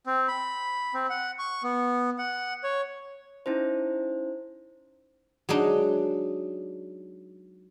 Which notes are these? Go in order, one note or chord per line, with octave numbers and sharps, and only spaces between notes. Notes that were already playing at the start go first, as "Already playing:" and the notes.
C4
B5
C4
F#5
C#6
B3
F#5
C#5
C#4 D#4 E4 C5
F#3 G#3 D4 D#4